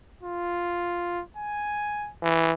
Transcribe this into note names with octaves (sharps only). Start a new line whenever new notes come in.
F4
G#5
E3